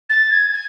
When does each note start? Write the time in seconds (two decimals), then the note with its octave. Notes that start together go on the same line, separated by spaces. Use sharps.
0.09 A6
0.31 G#6
0.53 G#6